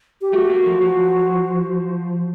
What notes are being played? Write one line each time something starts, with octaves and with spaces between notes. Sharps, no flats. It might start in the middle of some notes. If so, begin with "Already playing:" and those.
G4
A3 F#4
A#3
F3
F3